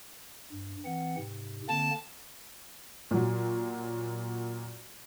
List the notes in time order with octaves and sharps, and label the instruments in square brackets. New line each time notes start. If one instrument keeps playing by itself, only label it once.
[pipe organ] G2
E3 C4 F#5
G#2 C3
[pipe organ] D3 A#3 C4 [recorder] A5
[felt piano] A#2 F#3